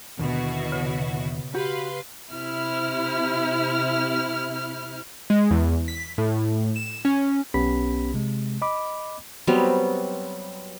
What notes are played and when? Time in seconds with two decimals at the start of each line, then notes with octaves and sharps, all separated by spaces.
0.19 D#2 B2 D3 E4 F#4
0.72 C#3
1.55 F#4 G4 B4 F5 C6
2.33 C3 E4 F6
5.30 G#3
5.50 E2
5.88 B6
6.18 A2
6.76 E7
7.05 C#4
7.54 B1 B3 C#4 G4 B5 B6
8.14 C3 G#3
8.62 D#5 B5 D6
9.47 F#3 G3 B3 C4